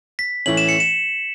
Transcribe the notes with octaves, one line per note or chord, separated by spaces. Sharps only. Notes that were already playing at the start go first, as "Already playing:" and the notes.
B6
A2 E3 A3 C#4 F#7
E7
C#7
E7